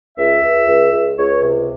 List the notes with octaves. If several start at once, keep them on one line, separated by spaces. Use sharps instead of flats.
C#2 E5
C#2
C#2
C#2
C#2 C#5
C3